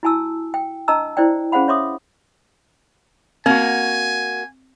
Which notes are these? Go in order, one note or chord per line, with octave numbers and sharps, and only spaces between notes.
E4 F#4 G#5 A5 E6
G5
D4 B4 D#5 A5 A#5 E6
E4 C5 D5 G5
C#4 G#4 C5 F5 F#5 B5
C#5 E5 C6 D6 D#6
A#3 C4 F#4 G#5